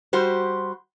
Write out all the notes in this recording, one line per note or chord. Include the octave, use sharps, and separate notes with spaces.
G3 F#4 G4 C5